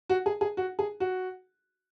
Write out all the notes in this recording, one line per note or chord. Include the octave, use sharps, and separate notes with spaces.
F#4
G#4
G#4
F#4
G#4
F#4